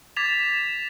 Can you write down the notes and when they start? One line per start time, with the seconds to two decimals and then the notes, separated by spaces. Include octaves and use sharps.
0.17 D6 G#6 A6 B6 E7 F7